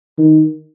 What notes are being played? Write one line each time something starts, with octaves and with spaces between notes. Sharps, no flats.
D#3